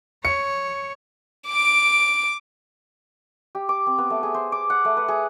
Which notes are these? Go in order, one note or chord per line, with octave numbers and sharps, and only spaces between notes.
C#5 C#7
D6 D7
G4
D6
C4
B3
A3
G#4
C5
D6
F#5
A3
B4
G#4